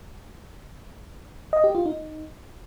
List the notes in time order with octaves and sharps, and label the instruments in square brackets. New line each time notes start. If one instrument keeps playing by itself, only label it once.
[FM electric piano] D#5
G4
F4
D#4